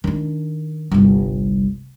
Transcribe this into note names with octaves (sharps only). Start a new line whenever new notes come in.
D#3 D4
G1 C2